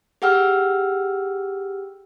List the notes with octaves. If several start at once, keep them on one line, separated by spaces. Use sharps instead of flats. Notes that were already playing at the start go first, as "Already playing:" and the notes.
G4 G#4 F#5 G5 E6 F6